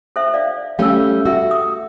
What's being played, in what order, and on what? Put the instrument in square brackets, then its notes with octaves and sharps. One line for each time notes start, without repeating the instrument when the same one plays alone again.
[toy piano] A4 C5 E5
D5 F5
[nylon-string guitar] G3 A3 C#4 [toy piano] F5 E6
[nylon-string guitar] F#4 [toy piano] A#4 E5
[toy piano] D#6